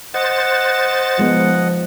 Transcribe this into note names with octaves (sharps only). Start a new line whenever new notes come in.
C5 D#5 F#5 A6
F3 G#3 B3